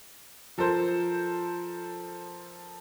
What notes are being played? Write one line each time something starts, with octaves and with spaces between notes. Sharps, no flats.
F3 A4 A#4 C5